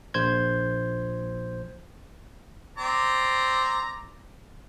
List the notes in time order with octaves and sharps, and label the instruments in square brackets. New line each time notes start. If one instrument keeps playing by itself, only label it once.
[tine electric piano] A#1 C5 G6 G#6
[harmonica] C4 D5 A#5